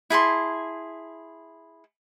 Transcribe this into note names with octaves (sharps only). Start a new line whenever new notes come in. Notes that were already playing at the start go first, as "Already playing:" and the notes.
E4 G#4 A5 C6